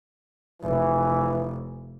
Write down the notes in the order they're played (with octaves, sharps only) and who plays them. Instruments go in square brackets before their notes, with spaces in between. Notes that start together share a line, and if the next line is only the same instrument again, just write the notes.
[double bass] F1 [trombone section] E3